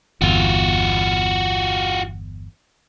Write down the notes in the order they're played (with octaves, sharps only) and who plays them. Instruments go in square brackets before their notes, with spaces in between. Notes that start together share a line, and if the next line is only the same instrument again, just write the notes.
[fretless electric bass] G1 E2 [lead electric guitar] F4 F#4